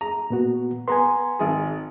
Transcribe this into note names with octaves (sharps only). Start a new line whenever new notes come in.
A#5
A#2 B3 F#4
B3 G#5 A#5 C6
G#1 G#4